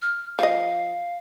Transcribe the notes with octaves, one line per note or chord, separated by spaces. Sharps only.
F6
F3 D#5 F5